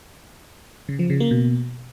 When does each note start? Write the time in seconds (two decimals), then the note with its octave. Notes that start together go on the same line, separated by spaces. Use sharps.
0.89 C#3
0.99 F3
1.10 C#3
1.20 A#3
1.31 B2